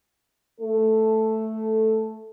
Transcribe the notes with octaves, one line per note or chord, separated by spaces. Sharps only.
A3 A4